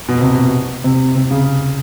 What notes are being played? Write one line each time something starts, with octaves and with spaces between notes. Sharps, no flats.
B2
C3
B2
C3
C3
C#3